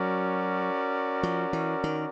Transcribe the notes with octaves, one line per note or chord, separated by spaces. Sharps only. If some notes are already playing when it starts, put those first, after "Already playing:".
Already playing: F#3 C#4 F#4 A#4 D5
F3
E3
D#3